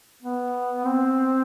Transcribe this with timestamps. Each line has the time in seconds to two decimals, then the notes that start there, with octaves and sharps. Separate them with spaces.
0.23 B3
0.85 C4